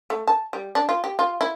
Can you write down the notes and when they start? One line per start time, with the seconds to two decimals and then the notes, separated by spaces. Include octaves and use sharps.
0.10 A3
0.27 A5
0.53 G3
0.75 D4
0.89 F4
1.04 G4
1.19 F4
1.41 E4